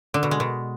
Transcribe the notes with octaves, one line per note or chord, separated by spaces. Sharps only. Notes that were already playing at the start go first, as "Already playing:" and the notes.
D3
B2
G#3
B2